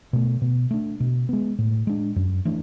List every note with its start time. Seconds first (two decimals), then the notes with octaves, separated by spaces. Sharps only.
0.13 B2 A3
0.42 B2
0.71 A3 D4
1.00 B2
1.29 G#3 B3
1.59 A2
1.87 G#3 D4
2.16 F#2
2.45 E3 A3 D4